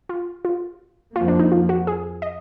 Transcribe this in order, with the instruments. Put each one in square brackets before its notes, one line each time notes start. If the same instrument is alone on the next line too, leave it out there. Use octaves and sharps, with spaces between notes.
[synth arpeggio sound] F4
F4
[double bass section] F2 F3 A#3 [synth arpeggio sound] F4
[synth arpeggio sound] D4
D#4
F4
F#4
G#4
D#5